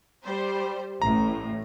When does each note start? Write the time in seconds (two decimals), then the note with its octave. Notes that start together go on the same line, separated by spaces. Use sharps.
0.25 G3 C5
1.02 A1 A2 A#5